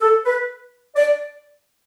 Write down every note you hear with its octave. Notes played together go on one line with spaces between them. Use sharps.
A4
B4
D5